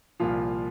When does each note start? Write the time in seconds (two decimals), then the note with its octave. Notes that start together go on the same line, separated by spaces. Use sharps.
0.20 C2 A#2 F3 F4